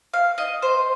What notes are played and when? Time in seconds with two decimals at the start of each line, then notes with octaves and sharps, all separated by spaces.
0.14 F5
0.38 D#5
0.62 C5